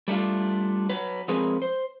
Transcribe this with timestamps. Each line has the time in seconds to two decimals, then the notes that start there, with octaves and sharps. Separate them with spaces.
0.08 G3 A3 D4 F4
0.89 F#3 B4
1.28 F3 G#3 C4 G#4 A#4 B4
1.62 C5